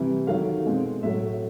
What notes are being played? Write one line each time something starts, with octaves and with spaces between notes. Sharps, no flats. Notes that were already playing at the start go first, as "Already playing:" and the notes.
Already playing: C3 E3 G3
D#3 F#3 A3 F5
B2 G#3 C4
A2 F#3 A3 E5